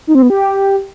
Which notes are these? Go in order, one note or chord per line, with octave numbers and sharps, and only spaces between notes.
D#4
C4
B3
G4